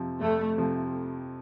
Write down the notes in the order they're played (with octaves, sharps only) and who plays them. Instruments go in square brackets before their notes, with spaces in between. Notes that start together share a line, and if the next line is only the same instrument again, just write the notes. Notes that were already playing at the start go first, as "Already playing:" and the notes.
Already playing: [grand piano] F2 C3 F3
[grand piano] F2 [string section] A3
[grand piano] C3 F3